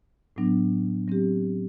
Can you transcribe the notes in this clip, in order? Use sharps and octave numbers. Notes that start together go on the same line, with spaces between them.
A2 F#3 B3 D4
F#3 C4 G4